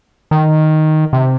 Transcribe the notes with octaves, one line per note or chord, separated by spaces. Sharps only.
D#3
C3